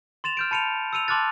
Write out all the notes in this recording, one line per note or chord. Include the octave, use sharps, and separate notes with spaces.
C6 A6 E7 F7
F6 G6 D7
A5 B5 C#7 D#7 F7
E6 C#7 D#7 F7
A5 C6 D6 F6 F#6 A6